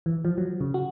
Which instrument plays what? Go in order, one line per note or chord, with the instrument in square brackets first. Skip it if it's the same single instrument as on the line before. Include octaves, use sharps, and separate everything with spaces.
[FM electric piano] E3
F3
F#3
C#3
F#4